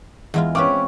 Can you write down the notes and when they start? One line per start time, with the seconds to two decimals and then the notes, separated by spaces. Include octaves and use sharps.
0.34 E2 G#3 F4
0.55 C4 C#4 F4 B4 C#6 D6